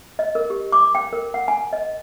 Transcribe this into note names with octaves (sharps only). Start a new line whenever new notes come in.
D#5
A#4
G4
D6
G5
A#4
F#5
G#5
D#5